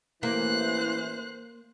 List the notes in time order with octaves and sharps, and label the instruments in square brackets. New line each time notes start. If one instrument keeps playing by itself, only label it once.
[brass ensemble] A1 E3 [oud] A#3 [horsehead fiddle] C5 [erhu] F#6